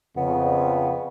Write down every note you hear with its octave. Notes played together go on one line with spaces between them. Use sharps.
F2 C#3 B3